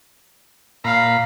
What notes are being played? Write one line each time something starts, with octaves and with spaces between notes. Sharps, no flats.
A#2 F5 A#5 B5